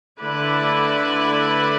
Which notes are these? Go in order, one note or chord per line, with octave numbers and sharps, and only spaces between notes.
D3 A3 E4 B4 D5